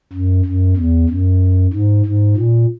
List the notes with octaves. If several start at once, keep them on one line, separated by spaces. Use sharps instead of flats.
F#2
F#2
E2
F#2
G#2
G#2
A#2